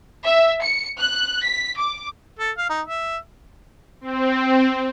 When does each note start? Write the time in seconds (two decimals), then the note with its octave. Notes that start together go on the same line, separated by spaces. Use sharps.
0.25 E5
0.62 C#7
0.99 F#6
1.43 B6
1.78 D6
2.39 A4
2.58 F5
2.70 D#4
2.87 E5
4.01 C4